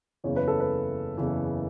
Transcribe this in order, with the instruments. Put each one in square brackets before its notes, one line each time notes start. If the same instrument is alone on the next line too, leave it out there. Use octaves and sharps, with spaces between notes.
[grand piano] F#1 E2 C#3 E3 [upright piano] C#5
[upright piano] B4
A4
B4
[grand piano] F#1 E2 C#3 E3